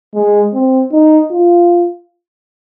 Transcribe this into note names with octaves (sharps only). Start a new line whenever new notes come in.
G#3
C4
D#4
F4